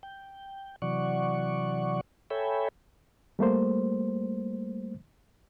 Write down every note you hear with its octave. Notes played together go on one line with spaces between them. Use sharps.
G5
C3 E3 F#3 D5 F#5 C#6
A4 C#5 E5 G5 G#5 B5
G3 A3 A#3 C5